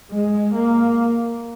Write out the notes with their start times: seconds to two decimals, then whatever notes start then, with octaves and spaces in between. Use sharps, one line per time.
0.11 G#3
0.54 A#3